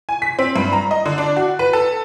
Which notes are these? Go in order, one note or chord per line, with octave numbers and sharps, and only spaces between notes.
G#5
B6
C4
G2
A#5
D#5
D3
D4
F#4
B4
A4